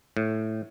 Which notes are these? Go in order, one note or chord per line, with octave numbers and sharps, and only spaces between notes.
A2